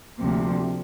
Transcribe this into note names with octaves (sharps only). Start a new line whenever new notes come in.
D2 C3 F3 A#3